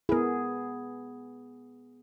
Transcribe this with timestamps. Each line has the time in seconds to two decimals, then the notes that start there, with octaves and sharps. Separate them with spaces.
0.09 B3 E4 G#4 A#4